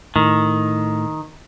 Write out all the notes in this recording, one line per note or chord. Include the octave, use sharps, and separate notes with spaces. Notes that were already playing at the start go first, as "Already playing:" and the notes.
A2 D#3